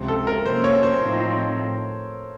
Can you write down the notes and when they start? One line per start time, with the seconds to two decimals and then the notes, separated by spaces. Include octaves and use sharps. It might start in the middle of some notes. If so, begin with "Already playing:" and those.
Already playing: C#2 C3 F3
0.08 A4
0.27 A#4
0.45 C3 F3 A#3 C#4 C5
0.64 C#5
0.83 C5
1.01 A2 F3 C4 D#4